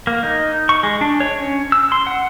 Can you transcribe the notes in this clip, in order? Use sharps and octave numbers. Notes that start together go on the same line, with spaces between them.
A#3
D#4
C#6
G#3
D4
C#5
C#4
E6
C6
F#5